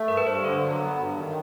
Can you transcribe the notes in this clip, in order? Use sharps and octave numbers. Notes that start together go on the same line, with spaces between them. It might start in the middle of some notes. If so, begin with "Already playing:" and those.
Already playing: A3
G2 A#4
B4
G2 C5
B4
D3 A4
F#3
B3
G2
D#3